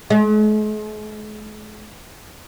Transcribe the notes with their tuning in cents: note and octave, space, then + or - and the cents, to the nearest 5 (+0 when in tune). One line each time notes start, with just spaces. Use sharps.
G#3 +45